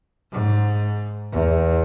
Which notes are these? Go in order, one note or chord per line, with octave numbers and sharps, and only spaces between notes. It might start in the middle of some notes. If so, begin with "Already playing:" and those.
G#2
E2